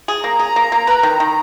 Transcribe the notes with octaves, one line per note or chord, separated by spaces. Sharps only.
G#4
A#3 A#5
G#4
A#3
A#3
B4
D#3
D#3